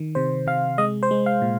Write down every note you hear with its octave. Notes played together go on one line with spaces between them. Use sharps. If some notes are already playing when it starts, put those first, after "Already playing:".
Already playing: D#3
C3 C5
C3 F5
G#3 D#5
C5
G#3
F5
A#2